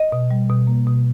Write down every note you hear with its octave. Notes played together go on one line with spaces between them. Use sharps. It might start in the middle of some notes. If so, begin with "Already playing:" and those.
Already playing: D#5
B2
G3
B2
A#3
B2